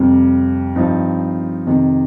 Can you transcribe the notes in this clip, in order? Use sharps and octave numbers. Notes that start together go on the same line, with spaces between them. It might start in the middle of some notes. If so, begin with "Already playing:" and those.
Already playing: F2 C3 G3
G2 F3 C4 D#4
F2 C3 D#3